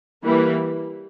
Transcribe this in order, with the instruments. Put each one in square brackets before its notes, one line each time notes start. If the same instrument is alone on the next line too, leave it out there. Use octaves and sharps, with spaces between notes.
[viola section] E3 G3 A#3